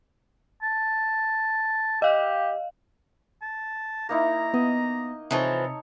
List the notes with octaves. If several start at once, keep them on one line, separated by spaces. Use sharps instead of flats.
A5
G4 D#5 F5
A5
A#3 D#4 E4 A#5
B3 D#5
C3 E3 F3 D#4 A4 C#5